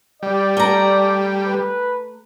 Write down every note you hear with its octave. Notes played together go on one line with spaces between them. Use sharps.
G3 D5
A3 A#5
B4